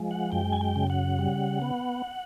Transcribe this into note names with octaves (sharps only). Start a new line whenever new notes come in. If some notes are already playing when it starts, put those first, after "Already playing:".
Already playing: F3 G#3
F#5
F#2 G5
G#5
G5
C#3
F#5
G3
B3